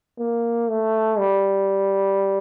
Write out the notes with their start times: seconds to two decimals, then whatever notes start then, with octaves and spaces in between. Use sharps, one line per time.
0.19 A#3
0.69 A3
1.18 G3